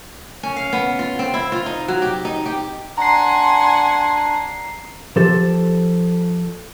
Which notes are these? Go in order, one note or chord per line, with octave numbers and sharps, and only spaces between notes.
C#4
F5
B3
F4
C4
E4
F4
D#4
F#3
G4
D#4
G4
D4 F#5 G#5 A#5 C6 C7
F3 G4 A4 C5